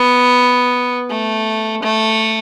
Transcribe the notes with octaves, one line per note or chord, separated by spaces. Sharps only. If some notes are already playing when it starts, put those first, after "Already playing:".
Already playing: B3
A3
A3